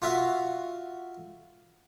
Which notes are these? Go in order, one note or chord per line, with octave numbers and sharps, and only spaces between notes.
F4 F#4 E5 F5